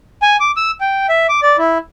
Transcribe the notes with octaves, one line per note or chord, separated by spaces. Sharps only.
G#5
D6
E6
G5
E5
D6
D5
E4